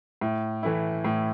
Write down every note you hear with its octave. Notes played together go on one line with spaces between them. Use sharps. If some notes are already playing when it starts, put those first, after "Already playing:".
A2
E3 A3 E4
A2